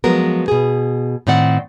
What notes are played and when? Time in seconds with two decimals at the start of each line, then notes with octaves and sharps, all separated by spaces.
0.04 F3 F#3 G#3 B3 A#4
0.48 B2 G#4
1.27 A2 D#3 C4 D5 F#5